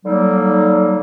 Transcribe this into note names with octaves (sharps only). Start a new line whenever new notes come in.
D3 F#3 G3 A#3 D#4